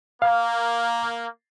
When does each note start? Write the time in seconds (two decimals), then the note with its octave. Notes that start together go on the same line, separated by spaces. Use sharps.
0.22 A#3 F5